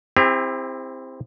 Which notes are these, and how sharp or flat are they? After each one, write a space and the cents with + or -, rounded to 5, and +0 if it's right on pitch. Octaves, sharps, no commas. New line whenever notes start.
C4 +0 E4 +0 G4 +45